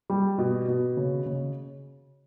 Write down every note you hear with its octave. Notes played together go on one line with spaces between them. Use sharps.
G3
B2
B2
C#3
C#3